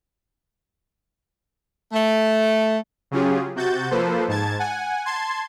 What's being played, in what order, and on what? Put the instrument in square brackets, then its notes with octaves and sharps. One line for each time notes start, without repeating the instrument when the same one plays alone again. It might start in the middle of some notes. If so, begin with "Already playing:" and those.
[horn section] A3
[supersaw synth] C#3 F#3 C#4 F4 G4 G#4
C3 F#4 G6 A6
F3 A#3 A4 B4 C5
G#2 A5 G#6 A6
F#5 G#5
A5 C6 G#6